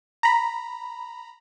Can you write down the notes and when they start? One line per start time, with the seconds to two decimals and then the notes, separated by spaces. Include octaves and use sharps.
0.23 A#5 B5